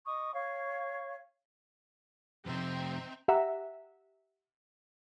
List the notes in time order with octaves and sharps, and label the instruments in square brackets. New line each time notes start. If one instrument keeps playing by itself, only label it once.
[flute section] D#5 C#6 D#6
C#5 F5 C#6
[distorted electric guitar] F2 C3 [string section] C4 D#4 E5
[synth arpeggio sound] G4 E5 F#5 A#5